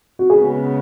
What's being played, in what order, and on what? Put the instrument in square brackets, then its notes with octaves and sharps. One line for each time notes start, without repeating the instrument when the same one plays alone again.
[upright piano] F#4
[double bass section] C#3 G#3 B3 [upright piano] G#4